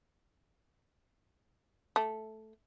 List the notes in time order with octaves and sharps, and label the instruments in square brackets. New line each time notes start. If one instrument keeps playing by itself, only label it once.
[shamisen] A3